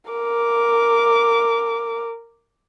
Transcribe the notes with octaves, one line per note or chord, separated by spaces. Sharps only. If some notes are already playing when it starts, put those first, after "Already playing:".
A#4 D6